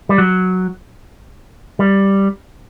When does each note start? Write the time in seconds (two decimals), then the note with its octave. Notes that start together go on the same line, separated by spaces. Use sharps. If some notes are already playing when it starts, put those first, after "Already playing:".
0.09 G3
0.18 F#3
1.79 G3